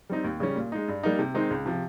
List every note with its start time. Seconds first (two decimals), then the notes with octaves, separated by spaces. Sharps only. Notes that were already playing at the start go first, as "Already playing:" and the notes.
0.09 G3 C4 D#4
0.24 D#2
0.40 C#3 G3 C#4
0.56 A#2
0.72 G#3 D#4
0.88 G2
1.03 G3 A#3 D#4
1.19 C3
1.34 D#3 G#3 C4 D#4
1.51 C#2
1.66 C3 F3